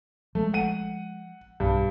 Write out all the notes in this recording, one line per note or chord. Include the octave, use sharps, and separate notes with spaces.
F3 G#3 A3
F#5 D#7
B1 G2